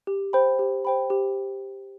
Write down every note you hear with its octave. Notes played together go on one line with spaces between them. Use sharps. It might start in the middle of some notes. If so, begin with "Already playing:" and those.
G4
C5 G5 B5
G4
C5 G5 B5
G4